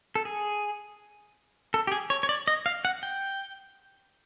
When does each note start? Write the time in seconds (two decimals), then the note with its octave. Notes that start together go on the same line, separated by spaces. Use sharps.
0.15 A4
0.25 G#4
1.74 A4
1.87 G4
1.92 G#4
2.10 C#5
2.23 C#5
2.29 D5
2.47 D#5
2.66 F5
2.85 F#5
3.03 G5